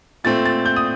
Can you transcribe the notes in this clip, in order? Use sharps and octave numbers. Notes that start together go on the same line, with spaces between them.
A#2 A3 C4 A6
A6
G6
D#6